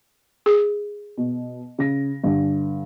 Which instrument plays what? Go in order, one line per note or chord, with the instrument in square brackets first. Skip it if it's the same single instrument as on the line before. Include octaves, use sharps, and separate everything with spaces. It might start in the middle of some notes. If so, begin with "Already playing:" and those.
[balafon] G#4
[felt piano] B2
C#3 A#6
G2 D3